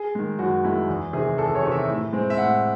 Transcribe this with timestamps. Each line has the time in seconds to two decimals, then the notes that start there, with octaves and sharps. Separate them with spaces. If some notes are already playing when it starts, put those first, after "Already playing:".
Already playing: G#4
0.15 D#3 G#3
0.39 F#2 F#4
0.64 D#3 G#3 E4
0.89 E2
1.13 C3 D#3 G#4
1.38 E2 A4
1.55 C#5
1.63 C3 D#3
1.71 E5
1.88 A2
2.13 G#3 C4
2.30 E5
2.37 A2 F#5